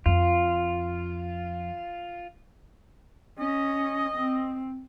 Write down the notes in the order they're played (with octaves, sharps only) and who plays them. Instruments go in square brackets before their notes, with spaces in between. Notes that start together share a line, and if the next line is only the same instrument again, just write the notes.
[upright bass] F2 [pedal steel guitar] F4
[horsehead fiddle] C#4 [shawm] D#5
[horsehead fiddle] C4